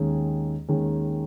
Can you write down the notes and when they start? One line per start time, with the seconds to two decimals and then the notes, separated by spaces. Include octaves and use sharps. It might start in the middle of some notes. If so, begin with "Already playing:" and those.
Already playing: D#2 D#3 G#3 C#4 G#4
0.68 D#2 D#3 G#3 C#4 G#4